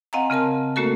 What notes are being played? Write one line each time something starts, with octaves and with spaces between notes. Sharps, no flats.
C4 D#5 F5 F#5 G#5 A#5
C#3 C4 A#4 A5
A3 A#3 C#4 F#4 A4 A#4